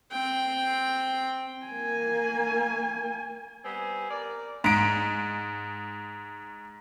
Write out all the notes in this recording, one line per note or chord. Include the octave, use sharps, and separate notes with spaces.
C4 G5
A#3 G#5
G3 B3 C4 G#5
A#4 D5
G#2 D7